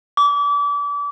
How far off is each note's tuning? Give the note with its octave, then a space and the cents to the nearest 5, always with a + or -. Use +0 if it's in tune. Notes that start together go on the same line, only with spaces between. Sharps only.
D6 -30